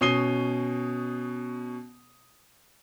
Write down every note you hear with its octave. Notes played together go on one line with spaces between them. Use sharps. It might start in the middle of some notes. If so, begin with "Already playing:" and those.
B2 C#4 D#6 C7 D#7 G7